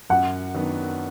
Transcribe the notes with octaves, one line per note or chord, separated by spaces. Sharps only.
F#2 F#5
D#3 F#3 B3 D4